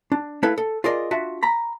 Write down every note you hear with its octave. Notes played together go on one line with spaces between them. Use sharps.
D4
A3 E4 A4 B4 F5
A4
F4 G#4 A#4 D5 D#5
D4 F4 F#4 E5
A#5 B5